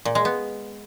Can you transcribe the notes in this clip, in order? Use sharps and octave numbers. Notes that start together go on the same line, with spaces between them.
A#2
G#3
B3